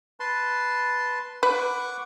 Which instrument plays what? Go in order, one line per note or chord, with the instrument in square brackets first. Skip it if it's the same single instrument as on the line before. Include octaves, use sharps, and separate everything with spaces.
[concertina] B4 A5 C6
[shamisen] B4 [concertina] F#5 C#6 D6